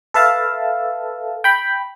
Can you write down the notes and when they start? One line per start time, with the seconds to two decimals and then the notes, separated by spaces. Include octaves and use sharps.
0.14 A4 B4 E5 F5 A5
1.44 G5 B5